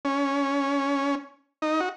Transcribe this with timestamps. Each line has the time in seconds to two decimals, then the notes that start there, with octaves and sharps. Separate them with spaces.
0.05 C#4
1.62 D#4
1.80 F#4